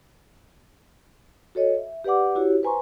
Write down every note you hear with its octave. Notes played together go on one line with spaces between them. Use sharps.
F#4 A4 C#5 D#5
E5
G4 B4 D5 F#5 D6
E4 F#4 G4 C#5
B4 C5 G#5 A#5 C6 C#6